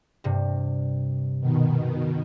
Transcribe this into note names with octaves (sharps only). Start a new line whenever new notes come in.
G2 C3
B2 D#3